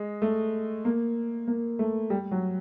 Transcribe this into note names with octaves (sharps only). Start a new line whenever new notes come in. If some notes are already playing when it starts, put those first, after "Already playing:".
Already playing: G#3
A3
A#3
A#3
A3
G3
F#3